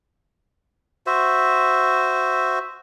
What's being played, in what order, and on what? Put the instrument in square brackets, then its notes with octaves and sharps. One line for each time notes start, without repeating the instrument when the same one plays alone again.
[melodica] F#4 C5 E5